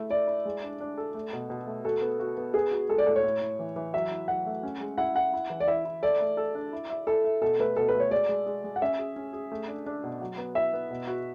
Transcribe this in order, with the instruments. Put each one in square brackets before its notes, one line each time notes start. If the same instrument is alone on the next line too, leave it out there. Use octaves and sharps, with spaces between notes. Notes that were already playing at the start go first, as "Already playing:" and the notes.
Already playing: [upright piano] A3 E4
[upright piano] E4 [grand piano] D5
[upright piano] E4
G#3
D4
D4
A4
A3
B2
B2
A3
[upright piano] F#4 [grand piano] A4
[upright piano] B3
F#4
B3
[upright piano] B3 [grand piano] G#4
[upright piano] F#4
[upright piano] G#3 [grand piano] A4
[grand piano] D5
[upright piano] A2 [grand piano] A4
[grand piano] C#5
[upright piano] A2
A2
E3
E3
[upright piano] F#3 [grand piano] E5
[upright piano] E4
[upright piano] F#3 [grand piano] F#5
[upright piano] A3
C#4
G#3
[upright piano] E4 [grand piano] F#5
[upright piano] E4 [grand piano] F#5
[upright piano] E4
E3
[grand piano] D5
[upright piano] E4 [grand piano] E5
[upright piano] E4
[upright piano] A4 [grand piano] D5
[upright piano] A3
A4
D4
E4
E5
[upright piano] E4 [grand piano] A4
[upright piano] E5
[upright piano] B2 [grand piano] A4
[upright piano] A3 [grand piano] B4
[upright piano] B2 [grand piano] A4
[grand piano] B4
[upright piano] A3
[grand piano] C#5
[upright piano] G#3 [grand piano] D5
[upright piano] G#3
G#3
G#3
[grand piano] F#5
[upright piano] C#4 [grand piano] E5
[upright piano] G#4
C#4
G#4
A3
D4
D4
B2
F#3
B3
[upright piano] E4 [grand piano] E5
[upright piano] B3
B2
F#4